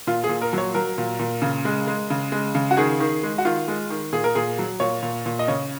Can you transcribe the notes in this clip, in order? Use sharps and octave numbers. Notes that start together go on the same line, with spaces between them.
A#2 F4
G#4
A#2
A#4
F#3 C#5
F#3 A#4
A#2
A#2
C#3
G#3
G#3
C#3
G#3
C#3
F#4
D#3 G#4
D#3
G#3
F#4
D#3 F4
G#3
D#3
A#2 G#4
A#4
A#2 G#4
F#3
A#2 C#5
A#2
A#2
D#5
C#3 C#5